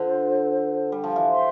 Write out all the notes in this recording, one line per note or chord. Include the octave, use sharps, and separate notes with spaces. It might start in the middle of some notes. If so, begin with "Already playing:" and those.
Already playing: D3 F4 A4 C5
G3
F3
E3
C5 E5 G5 C6